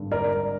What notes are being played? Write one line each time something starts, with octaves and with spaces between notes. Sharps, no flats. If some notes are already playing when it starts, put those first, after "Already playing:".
Already playing: G#1 G2 D3
A#4 D5